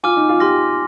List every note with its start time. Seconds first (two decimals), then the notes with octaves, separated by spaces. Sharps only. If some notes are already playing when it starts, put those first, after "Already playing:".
0.03 F4 G#5 D6 F6
0.16 D#4
0.29 F4
0.40 G4 C6 F6 A#6